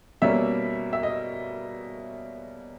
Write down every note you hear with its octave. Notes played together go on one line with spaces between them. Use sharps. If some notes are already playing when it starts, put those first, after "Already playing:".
B2 G3 A#3 C#4 E5
E5
D#5